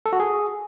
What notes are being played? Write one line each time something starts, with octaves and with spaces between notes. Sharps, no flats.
A4
F#4
G#4